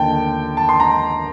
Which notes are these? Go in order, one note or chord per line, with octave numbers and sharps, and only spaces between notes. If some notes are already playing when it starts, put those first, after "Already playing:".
Already playing: D#2 D3 G5 A5
A5
C6
A#5